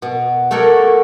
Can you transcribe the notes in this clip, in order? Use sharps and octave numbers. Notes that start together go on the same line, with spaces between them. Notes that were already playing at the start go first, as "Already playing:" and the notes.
B2
A3 F#4 A4 A#4 C#5 D5